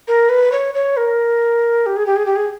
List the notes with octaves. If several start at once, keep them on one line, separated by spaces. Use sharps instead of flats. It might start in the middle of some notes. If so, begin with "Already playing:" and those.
A#4
B4
C#5
C#5
A#4
G4
G#4
G4
G#4
G4
G#4